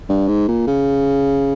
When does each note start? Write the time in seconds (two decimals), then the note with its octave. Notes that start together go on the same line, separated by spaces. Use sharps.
0.09 G2
0.28 G#2
0.48 A#2
0.67 C#3